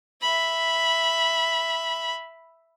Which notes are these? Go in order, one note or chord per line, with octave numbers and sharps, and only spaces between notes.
E5 B5